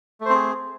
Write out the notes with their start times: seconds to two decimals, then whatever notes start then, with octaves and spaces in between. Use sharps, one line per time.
0.21 A3
0.25 C5
0.30 C4
0.35 G#4